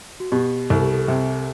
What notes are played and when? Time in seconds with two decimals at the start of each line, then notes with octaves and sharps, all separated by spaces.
0.20 F#4
0.32 B2 G4
0.70 C2 A4
0.82 G4
0.94 A4
1.08 C3